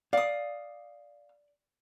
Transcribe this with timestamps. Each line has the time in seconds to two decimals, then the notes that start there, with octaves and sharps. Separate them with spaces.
0.13 D5 F5 D#6